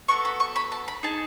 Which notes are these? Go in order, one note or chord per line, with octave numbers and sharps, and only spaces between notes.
B3 F#4 A4 C#6
B5
C#6
B5
A5
B5
D#4 G#4 A5